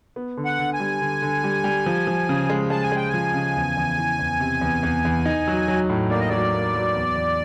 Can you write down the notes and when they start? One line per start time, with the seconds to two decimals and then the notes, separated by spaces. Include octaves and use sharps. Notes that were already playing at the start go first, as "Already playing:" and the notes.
0.16 B3
0.37 D3
0.45 F#5
0.59 D3
0.73 G#5
0.80 G3
1.01 D3
1.22 D3
1.44 G3
1.64 G3
1.86 F3
2.07 F3
2.29 C#3
2.50 G#3
2.70 G#3 A5
2.83 G#5
2.92 G#3 G5
3.09 G#5
3.14 F3
3.34 C#3
3.56 E2
3.77 E2
3.98 E3
4.19 E2
4.40 C3
4.61 E2
4.83 E2
5.05 E2
5.26 D#4
5.47 F#3
5.68 F#3
5.90 A2
6.10 A#3 D5
6.20 D#5
6.29 F#3 D5
6.54 A#3
6.74 F#3
6.95 E2
7.16 E2